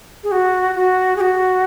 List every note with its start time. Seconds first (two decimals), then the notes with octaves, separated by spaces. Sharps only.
0.24 G#4
0.32 F#4
0.75 F#4
1.16 G#4
1.21 F#4